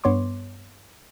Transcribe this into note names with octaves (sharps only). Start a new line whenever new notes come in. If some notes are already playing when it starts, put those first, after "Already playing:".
G2 B3 C#5 C6 D6